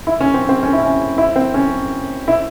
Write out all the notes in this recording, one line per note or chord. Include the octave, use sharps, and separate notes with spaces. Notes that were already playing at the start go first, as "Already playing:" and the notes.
E4
C#4
C4
C4
C#4
E4
C#4
E4
C4
C#4
E4